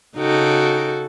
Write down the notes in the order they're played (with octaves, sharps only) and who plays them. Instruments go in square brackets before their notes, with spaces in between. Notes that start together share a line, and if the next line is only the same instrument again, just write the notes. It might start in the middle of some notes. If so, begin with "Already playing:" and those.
[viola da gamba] C#3 F#4 A4 [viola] D#4 G5